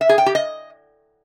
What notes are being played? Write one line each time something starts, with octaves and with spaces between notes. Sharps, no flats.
E5
G#4
G5
G4
D#5